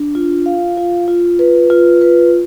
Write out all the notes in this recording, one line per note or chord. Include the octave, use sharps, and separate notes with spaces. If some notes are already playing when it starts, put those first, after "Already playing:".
Already playing: D4
F4
F5
F4
F4
B4
F4
B4